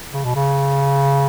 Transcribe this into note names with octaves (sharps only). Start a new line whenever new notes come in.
C#3
B2
C#3